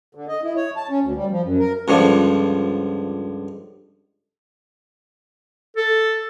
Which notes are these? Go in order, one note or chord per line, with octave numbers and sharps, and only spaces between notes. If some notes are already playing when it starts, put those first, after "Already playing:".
D3
D#5
E4
C#5
A5
C#4
D2
G3
F3
F#2
A#4
C#2 G2 D3 F3
A4